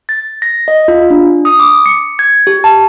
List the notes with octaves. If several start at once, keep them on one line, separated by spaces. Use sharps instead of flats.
A6
A#6
D#5
F4
D4
D#6
D6
C#7
G#6
G4
A5